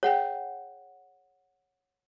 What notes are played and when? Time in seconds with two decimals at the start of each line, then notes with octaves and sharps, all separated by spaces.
0.03 G#4 C#5 F#5 G5